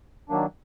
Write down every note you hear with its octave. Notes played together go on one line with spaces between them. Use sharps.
D#3 F#3 A#3 D4